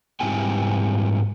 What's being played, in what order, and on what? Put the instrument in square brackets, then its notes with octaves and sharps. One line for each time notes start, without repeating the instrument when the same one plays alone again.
[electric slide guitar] G#2 G3 C4 E4 G5 G#5